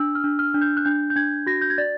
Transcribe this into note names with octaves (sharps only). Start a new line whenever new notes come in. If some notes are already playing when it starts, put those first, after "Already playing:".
Already playing: D4 E6
F6
D4
F6
D4
G6
F#6
D4 G6
G6
D4 G#6
F#4 A#6
G6
G#6
D5 A6